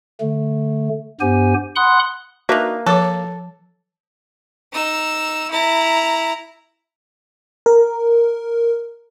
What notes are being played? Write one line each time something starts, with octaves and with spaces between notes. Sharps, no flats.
D3 A3
G2 B3 G4 C5 G#5
F#5 B5 C6 D#6 F#6
A#3 D4 D#4 F#4 B4 E5
F3 A4 B4 C#5 D6
D#4 E6
E4 A#5
A#4